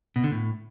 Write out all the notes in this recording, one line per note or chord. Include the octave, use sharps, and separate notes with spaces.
B2
D3
A2